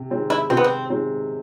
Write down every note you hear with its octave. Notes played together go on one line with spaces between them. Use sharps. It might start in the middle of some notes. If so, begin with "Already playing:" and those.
Already playing: C3
D#3 G#3 C4
E4
C3 C4
B3
C4
D#3 G#3 C4